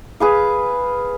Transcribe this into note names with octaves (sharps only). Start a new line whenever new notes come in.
G#4 B4 F5